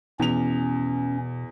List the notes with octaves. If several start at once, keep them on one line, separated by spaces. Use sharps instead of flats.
E2 B2 C#4 F7